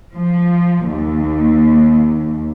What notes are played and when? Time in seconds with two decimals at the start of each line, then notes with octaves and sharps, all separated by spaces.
0.15 F3
0.88 D#2